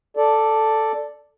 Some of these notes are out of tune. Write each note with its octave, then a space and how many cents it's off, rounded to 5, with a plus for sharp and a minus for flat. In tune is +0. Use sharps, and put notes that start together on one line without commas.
A4 +0 D5 +0